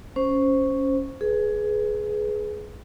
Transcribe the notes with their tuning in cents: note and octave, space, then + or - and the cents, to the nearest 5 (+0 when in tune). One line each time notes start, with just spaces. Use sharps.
C#4 +0 C5 +0
G#4 +20 B4 +0